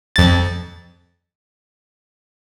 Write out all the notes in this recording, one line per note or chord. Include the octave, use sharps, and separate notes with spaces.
F2 A6